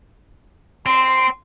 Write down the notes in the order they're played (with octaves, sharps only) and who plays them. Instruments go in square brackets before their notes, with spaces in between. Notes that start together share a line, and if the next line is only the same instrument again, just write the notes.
[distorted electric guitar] C4 [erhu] C6